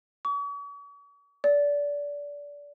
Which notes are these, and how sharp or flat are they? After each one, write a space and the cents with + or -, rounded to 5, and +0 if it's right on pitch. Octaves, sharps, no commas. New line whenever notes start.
C#6 +45
D5 -25